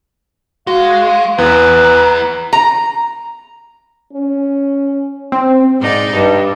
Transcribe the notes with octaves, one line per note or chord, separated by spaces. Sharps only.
G#3 F#4 F5
E2 B3 E4 B4 A#5
A#5
C#4
C4
G#2 D#4 D5
G2